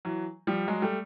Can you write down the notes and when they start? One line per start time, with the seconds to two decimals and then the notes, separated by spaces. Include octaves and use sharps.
0.05 E3 F#3
0.47 F3 G3
0.68 F#3 G#3
0.82 G3 A3